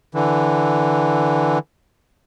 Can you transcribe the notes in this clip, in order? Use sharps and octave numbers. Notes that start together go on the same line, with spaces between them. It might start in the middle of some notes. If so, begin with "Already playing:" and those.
D3 E3